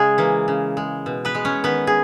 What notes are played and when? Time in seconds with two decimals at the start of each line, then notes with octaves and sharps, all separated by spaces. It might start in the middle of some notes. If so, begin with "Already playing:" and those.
Already playing: C#3 G#3 G#4
0.18 E3 A#3
0.48 C#3
0.77 G#3
1.06 B2
1.25 B3 B4
1.35 G#3
1.45 C#4 C#5
1.64 D#3 B3 B4
1.87 G#4